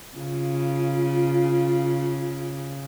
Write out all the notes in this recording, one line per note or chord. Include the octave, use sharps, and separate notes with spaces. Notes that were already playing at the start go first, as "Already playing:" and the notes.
C#3 F4